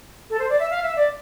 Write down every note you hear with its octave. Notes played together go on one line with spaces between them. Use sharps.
A4
C5
D5
E5
F5
E5
D5